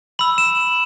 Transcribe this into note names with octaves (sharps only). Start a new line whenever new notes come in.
B5 E6 F#7
E7